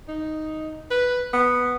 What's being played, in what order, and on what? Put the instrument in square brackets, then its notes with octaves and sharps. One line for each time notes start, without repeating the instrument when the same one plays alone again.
[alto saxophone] D#4
B4
B3